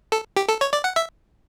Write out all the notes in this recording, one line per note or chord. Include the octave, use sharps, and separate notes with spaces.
A4
G4
A4
C#5
D5
F#5
E5